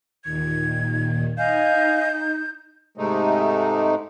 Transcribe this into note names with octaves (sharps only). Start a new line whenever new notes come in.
D#2 A#2 D#3 G#6
D#4 D#5 F5 G#5 G6
G#2 C3 G#3 A3 D#4